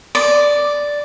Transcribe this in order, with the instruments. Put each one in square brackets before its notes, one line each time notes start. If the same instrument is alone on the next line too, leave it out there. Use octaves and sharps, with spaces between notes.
[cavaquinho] D5